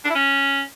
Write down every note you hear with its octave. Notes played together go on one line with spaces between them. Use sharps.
D4
E4
C#4